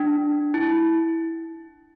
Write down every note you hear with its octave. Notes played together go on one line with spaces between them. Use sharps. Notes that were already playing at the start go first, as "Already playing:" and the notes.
Already playing: D4
E4